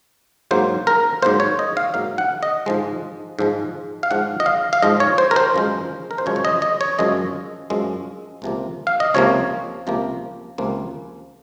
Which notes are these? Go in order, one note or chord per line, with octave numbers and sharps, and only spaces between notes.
G#2 F#3 A#3 C5
A#4
G#2 F#3 A#3 C5
C#5
D#5
F5
G#2 F#3 A#3 F5
F#5
D#5
G#2 F3 G#3
G#2 F3 G#3
F5
G#2 F3 G#3 F#5
D#5
F5
F5
G#2 F3 G#3 D#5
C#5
C5
A#4
C5
F#2 F3 G#3
A#4
C5
F#2 F3 G#3 C#5
C#5
D#5
D#5
C#5
F#2 F3 G#3 D#5
F#2 F3 G#3
C#2 C3 F3 A#3
F5
D#5
C#2 C3 F3 A#3 C#5
C#2 C3 F3 A#3
C#2 C3 F3 A#3